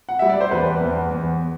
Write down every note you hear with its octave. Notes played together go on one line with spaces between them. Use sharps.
F#5
G3 E5
D5
C5
E2 B4
E2
E2